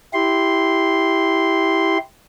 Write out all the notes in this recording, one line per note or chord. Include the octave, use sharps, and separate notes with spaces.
E4 G4 C6